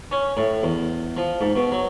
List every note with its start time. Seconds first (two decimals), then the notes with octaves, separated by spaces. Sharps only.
0.11 C#4
0.37 A2
0.63 E2
1.17 F3
1.41 G#2
1.56 B2
1.72 F#3